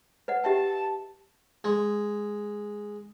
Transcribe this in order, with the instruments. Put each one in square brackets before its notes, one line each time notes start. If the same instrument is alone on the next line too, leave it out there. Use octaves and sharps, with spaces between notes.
[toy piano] B4 D#5 F#5
[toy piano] G4 E5 G5 [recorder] A5
[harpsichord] G#3